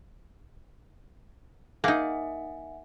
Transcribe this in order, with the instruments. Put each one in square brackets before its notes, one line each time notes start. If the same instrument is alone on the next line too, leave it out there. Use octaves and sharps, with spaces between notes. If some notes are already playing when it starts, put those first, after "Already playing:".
[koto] A#3 D#4 [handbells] E5 F#5 G#5